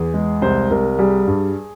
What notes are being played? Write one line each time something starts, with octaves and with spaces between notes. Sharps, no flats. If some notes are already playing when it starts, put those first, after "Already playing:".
Already playing: E2 G#4
G#3
C2 C5
C2 A#4
G3 G#4
G2